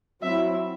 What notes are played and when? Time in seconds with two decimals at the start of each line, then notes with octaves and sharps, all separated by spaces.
0.22 F#3 C4 E4 E5